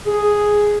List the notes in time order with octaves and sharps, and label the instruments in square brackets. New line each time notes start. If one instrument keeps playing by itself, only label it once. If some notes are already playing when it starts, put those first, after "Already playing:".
[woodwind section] G#4